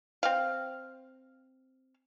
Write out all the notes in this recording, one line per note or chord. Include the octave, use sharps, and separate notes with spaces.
C4 F5